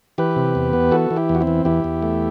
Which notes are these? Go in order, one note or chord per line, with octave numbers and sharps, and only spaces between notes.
E3 G4 B4
C3
E2
B3
E3 F#4 A4
E3
E4 G4
E2
F#4
C4 E4
E3
E2 E4 G4
E2
A3